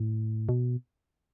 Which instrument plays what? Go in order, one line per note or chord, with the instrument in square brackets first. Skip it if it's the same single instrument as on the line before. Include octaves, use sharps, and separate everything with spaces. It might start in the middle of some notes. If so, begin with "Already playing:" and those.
Already playing: [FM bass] A2
B2